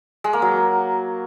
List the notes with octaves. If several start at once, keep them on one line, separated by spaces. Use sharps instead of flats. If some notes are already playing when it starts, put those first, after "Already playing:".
G#3
A#3
F#3